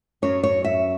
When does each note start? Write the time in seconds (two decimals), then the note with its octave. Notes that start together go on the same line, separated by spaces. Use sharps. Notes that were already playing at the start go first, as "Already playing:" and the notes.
0.22 F#2 F#3 C#4 C#5
0.43 C#5
0.64 E5